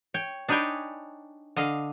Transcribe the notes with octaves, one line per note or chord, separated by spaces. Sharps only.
C#5 G5
D4 D#4 B4 C#5 G5 G#5
D3 D#5 F5